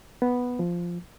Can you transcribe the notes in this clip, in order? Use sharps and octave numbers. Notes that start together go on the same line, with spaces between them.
B3
F3